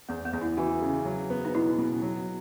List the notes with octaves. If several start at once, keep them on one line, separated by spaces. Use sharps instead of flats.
E2 B3
B3
E2
E4
E3 F#4
C#3
F#3
B3
D#4
B2 E4
B2
F#3